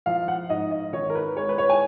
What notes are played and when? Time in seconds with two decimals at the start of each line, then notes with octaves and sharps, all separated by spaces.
0.06 F3 F5
0.28 F#5
0.50 G#2 D#5
0.71 D#5
0.93 G#1 C#5
1.10 A#4
1.15 B4
1.36 G#3 C#5
1.49 B4
1.58 C#5
1.70 G#5